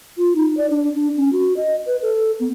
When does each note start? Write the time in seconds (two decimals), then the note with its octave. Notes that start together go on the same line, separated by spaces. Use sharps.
0.17 F4
0.36 D#4
0.57 D5
0.71 D4
0.95 D4
1.17 C#4
1.33 F#4
1.57 D#5
1.86 B4
2.02 A4
2.40 B3